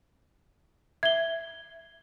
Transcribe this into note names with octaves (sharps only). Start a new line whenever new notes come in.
E5 G#6 G7